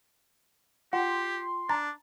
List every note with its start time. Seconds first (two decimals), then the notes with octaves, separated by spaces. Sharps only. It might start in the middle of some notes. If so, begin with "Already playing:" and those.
0.93 F4 G4 F#5 G5 C6
1.69 D4 A5 A#5 A6